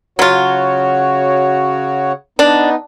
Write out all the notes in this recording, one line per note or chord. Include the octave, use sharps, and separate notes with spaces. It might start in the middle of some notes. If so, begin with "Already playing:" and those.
C#3 F#3 F4 F#4 C#5
B3 D4 D#4